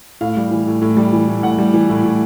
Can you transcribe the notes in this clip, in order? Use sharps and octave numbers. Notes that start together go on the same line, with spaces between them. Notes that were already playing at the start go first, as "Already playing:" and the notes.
A2 F5
G3
E3
A2
A2
G3
E3
A2
A2 F#5
G3
E3
A2
A2